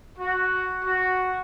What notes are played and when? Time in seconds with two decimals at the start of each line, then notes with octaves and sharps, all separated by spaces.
0.18 F#4
0.83 F#4